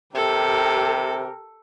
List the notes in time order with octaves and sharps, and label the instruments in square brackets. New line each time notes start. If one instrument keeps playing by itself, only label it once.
[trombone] C3 [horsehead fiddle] G4 A#4 [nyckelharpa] A4